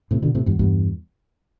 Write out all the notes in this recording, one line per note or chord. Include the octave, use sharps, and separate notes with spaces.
A2 C3
B2 D3
A2 C3
E2 G2
E2 G2